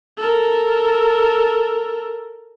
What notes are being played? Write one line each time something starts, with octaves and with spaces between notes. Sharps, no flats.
A4 A#4